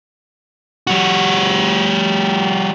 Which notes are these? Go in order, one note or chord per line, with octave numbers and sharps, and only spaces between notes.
G3 F#4